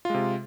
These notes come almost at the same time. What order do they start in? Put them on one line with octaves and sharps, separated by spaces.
F4 G#3 C3